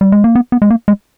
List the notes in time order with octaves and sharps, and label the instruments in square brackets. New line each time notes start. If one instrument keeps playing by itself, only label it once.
[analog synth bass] G3
G#3
A#3
B3
B3
G#3
A#3
G#3